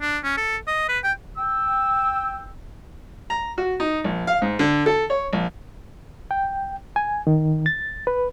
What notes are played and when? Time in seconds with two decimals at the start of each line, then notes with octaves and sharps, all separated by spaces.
0.01 D4
0.24 C#4
0.38 A4
0.67 D#5
0.89 B4
1.04 G5
1.37 G5 E6
3.30 A#5
3.58 F#4
3.80 D#4
4.04 A#1
4.27 F5
4.42 G#2
4.59 D3
4.86 A4
5.10 C#5
5.33 A#1
6.31 G5
6.96 G#5
7.27 D#3
7.66 A6
8.07 B4